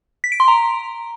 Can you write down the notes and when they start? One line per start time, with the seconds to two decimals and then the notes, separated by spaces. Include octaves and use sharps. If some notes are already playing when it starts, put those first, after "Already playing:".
0.24 B6
0.32 D7
0.40 C6
0.48 A#5